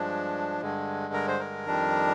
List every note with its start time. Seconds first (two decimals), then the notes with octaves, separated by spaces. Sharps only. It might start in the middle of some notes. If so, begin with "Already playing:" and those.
Already playing: G2 F3 G#3 D4
0.61 G2 D3 G#3
1.13 A#4
1.28 C5
1.40 A#4
1.67 F2 D#3 G3 D4